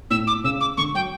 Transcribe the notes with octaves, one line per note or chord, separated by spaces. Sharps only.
A2 E6
D6
C#3 E6
D6
D3 C#6
F#3 G5